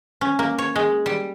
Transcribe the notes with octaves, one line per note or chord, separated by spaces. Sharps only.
C#4
A#3
C#5
G#3
G3